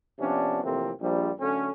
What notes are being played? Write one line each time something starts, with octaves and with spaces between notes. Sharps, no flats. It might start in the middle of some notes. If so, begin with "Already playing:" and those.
C3 F3 B3 C#4 D4
F2 A2 C3 E3 A#3 C4
A#1 F3 G3
F#2 D3 A3 C#4